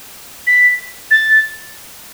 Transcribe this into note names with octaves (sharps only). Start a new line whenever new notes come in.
B6
A6